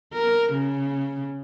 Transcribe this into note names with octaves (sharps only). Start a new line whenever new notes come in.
A#4
C#3